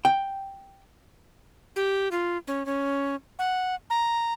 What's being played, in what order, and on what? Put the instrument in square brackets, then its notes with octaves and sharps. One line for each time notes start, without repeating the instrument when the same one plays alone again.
[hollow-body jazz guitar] G5
[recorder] G4
F4
C#4
C#4
F#5
A#5